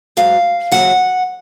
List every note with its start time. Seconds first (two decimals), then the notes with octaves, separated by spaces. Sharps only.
0.17 G#2 F#3 F5
0.72 D#2 C#3 F#3 F#5